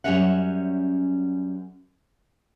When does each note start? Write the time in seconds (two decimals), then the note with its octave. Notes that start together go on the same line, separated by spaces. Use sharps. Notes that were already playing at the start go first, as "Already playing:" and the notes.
0.04 F#2 F3 G3 C#4 E5 F#5